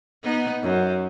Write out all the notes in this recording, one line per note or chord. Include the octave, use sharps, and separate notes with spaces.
B3 D#4
F#2